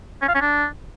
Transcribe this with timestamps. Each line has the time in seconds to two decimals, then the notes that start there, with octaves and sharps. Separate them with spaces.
0.22 C#4
0.28 F5
0.35 C#4
0.41 D4